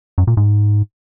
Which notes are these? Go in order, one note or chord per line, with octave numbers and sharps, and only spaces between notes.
F#2
A#2
G#2